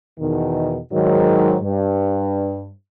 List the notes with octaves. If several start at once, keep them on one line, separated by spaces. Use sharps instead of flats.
E2 B2 D#3
G#2 D#3 F#3
G2